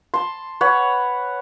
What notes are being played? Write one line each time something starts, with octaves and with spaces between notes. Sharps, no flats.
A5 C6
B4 C#5 F#5 B5